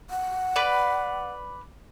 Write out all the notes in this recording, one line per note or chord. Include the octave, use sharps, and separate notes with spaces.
F#5
B4 D5